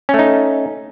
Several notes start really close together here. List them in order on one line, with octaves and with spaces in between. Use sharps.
C#4 A3 D#4